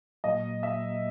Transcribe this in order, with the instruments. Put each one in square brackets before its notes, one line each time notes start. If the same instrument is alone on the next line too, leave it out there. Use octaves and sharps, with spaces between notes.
[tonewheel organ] A#2 F#3 A#3 [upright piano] D#5
[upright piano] E5